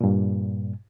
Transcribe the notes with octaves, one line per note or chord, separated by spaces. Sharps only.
G2 A#2